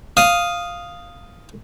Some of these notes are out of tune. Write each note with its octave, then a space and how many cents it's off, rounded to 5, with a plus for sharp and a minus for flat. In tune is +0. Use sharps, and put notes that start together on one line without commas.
F5 +0 D#6 +0